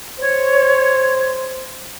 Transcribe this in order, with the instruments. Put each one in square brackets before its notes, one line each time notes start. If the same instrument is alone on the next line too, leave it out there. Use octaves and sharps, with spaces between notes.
[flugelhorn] C5 [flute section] C#5